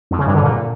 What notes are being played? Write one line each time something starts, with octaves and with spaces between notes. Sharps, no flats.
F2
C#3
G2
D3
A#2